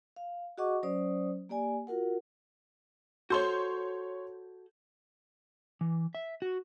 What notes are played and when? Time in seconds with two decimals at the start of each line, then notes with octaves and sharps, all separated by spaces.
0.16 F5
0.58 F#4 G#4 D#5 F#5 C#6 D6
0.83 F#3 C#4 C5 D5 D#6
1.49 A#3 G4 D5 G#5
1.87 F4 F#4 A#4 F#5
3.30 F#4 A4 C5 C#5 C6 G6
5.81 E3
6.15 E5
6.42 F#4